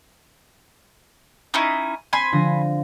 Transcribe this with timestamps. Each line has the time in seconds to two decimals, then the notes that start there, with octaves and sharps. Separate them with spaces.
1.54 C#4 D#4 E4
2.13 C4 G#5 B5 C6
2.32 D3 F3 A#6